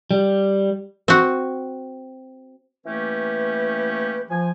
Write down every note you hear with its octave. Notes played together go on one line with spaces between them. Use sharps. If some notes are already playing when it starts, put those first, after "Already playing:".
G3
C4 F#4
E3 A3 A#3 C#4 G4 B4
F3 G#5